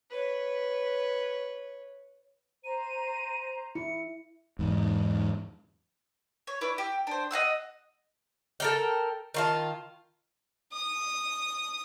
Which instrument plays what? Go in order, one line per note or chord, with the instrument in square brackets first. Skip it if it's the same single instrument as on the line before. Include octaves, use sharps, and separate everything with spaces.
[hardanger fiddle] B4 C#5
[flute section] C5 A#5 [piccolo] D#7
[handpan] E4 [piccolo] C#7
[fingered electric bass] E2 G#2
[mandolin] C#5
E4 B4 D5
G4
D4 C5
D#5 F5 F#5 E6
[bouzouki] A4 A#4 G5
D#3 F4 A5
[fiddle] D#6